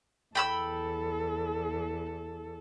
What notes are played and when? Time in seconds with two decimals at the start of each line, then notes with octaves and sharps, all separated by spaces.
0.35 E2 A4 G5 B5 E6